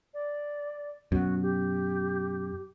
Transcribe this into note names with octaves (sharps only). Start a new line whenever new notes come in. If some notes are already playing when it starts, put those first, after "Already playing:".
D5
F#2 B2 F#4
G4